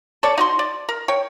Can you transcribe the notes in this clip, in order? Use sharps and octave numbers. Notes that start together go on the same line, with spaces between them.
A4 C#5 D5
D#4 F#4 C6
D5
A#4
C#5 G5